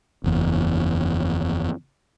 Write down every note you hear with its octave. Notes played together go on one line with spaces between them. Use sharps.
F#1 E2